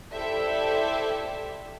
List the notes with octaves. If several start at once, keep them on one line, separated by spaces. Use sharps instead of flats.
E4 G4 A4 C5 D5 E5